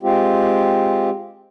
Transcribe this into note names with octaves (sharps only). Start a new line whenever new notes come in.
G#3 C4 F4 G4